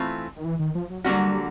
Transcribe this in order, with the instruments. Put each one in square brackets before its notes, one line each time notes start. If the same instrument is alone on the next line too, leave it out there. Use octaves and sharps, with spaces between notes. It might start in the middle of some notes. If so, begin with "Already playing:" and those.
Already playing: [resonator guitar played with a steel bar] E3 A3 C4 F4
[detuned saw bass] D#3
E3
D#3
F3
F#3
[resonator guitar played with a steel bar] D3 F#3 A#3 C#4 F#4 [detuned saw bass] G3